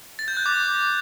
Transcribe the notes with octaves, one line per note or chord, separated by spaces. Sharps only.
A6
G6
F#6
D6